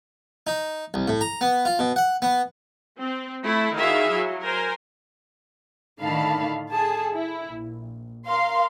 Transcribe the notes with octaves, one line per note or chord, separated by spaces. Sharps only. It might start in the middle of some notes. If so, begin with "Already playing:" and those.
D#4
C2
A2
A#5
B3
F4
B2
F#5
B3
C4
A3 E4
D#3 E4 F#4 G#4 E5 F5
F#3
A#4 C5 G#5
A2 D3 D#3 F5 A5 B5
G#4 A4 A5
E4
A#1
A#4 F5 C6